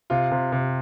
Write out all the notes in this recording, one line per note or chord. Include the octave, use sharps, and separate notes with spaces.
C3 F4
C3
C3